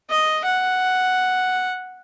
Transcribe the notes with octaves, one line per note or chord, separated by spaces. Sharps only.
D#5
F#5